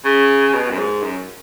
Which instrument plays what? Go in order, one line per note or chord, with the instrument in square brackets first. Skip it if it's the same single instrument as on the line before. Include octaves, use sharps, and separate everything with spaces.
[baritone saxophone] C#3
B2
F#2
G#2
F#2